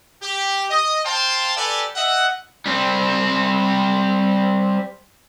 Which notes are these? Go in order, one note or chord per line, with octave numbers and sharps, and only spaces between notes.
G4
D#5
C5 F5 G5 A5 C6
G4 A4 B4 D5 G#5
D#5 E5 F#5
G3 C4